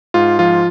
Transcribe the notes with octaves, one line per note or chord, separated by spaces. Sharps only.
G#2 F4
F3 F4